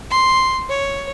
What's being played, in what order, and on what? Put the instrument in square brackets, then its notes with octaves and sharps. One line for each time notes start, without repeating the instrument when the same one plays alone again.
[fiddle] C6
C#5